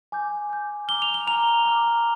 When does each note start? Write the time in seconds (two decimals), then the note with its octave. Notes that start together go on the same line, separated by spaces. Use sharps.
0.12 G#5 D6 G6
0.50 G#5 D6 G6
0.88 A#5 D6 F6 G7
1.02 F7
1.14 G7
1.27 A#5 D6 F6 F7
1.65 A#5 D6 F6